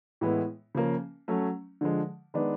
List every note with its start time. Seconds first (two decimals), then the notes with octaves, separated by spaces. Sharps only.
0.21 A2 E3 G#3 B3 E4
0.75 C#3 F3 A#3 C#4
1.28 F#3 A3 C#4
1.81 D3 F3 G#3
2.34 D#3 G#3 B3 D4